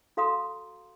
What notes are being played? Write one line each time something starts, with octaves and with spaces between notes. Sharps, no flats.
F#4 A4 F5 A#5 C6 D#6